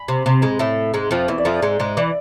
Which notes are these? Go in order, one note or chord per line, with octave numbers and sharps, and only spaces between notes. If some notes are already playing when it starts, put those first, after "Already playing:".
Already playing: G#5 B5
C3
C3
G#2 G#3
A2 A3 E5
G#2 G#3
F2 F3
E2 E3 E5
D5
F2 F3 E5
G#2 G#3
G#2 G#3
E3 D5